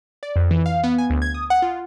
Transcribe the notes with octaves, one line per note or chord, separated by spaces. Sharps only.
D5
F2
E3
F5
B3
G#5
D2
G#6
D#6
F#5
F4